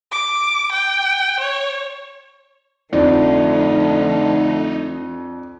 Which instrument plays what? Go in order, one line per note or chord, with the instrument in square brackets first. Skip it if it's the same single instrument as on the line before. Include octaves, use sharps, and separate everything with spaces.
[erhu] D6
G5
C#5
[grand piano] F2 D4 [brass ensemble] D3 A3 [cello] F3 [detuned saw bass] D#4